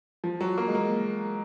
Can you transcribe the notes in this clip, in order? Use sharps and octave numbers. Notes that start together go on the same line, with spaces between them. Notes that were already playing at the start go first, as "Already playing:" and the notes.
F3
F#3
A#3
G#3
A#3